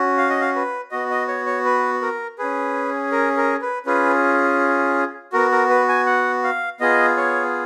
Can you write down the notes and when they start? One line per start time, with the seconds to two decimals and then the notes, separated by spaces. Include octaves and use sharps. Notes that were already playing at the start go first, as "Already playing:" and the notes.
Already playing: C#4 F#4
0.17 F5
0.30 D#5
0.41 F5
0.55 B4
0.91 B3 F#4 D#5
1.10 D#5
1.28 C#5
1.46 C#5
1.65 B4
2.02 A#4
2.38 C#4 G#4 B4
3.12 A#4
3.37 A#4
3.62 B4
3.86 C#4 F4 G#4 B4
5.33 B3 F#4 A#4
5.51 A#4
5.70 B4
5.89 G#5
6.06 F#5
6.44 F5
6.80 B3 F4 G#4 D#5
7.17 C#5